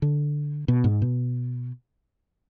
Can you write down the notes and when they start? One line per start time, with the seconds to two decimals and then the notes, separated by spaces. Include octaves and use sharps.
0.02 D3
0.68 B2
0.84 G#2
1.02 B2